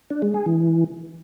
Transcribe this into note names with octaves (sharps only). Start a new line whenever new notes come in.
D4
G#3
G#4
E3